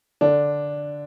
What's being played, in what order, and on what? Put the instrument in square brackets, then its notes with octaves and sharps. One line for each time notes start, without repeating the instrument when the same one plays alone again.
[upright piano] D3 D4